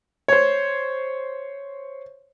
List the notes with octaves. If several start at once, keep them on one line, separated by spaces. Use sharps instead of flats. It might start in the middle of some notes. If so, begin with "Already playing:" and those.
C5 C#5